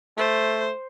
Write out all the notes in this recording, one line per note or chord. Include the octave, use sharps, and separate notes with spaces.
A3 C5